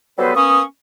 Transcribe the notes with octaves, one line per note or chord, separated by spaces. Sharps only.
F#3 G3 B3 A4 B4 C5
A#3 B3 C#4 C#6 D#6